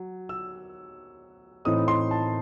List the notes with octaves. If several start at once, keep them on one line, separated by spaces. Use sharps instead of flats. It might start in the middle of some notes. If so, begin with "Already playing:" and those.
Already playing: F#3
E6
A2 E3 C4 D#4 D#6
C6
A5